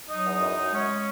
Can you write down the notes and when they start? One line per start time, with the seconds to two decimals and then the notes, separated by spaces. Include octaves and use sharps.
0.08 F#3 D#4 D#5
0.24 E2
0.41 F#2
0.57 F#2
0.72 G#3 C#4 C#5
0.88 G#3